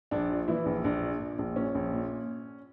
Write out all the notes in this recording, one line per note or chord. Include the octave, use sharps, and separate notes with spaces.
A#1 D4
F3
A#2 E3 E4
A#1
A#1 D4
A#2
A#2
A#1
A#2 C#4
A#1
A#2